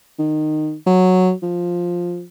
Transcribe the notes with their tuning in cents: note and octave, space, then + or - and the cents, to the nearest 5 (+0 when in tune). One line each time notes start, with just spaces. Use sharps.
D#3 -20
F#3 -5
F3 +5